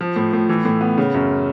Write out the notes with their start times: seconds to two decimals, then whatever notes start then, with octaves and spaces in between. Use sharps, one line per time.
0.01 F3
0.16 A2
0.33 A2
0.49 E3
0.65 A2
0.81 B3
0.98 C#3
1.14 F#2